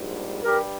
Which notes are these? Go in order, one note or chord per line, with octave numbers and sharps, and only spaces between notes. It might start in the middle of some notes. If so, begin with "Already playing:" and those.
Already playing: A#1 G#2 G3
G2 G3 G4 A#4